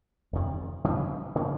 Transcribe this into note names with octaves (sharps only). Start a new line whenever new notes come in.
F2 C3 D#3
C#3 E3 G3
C#3 F3 A#3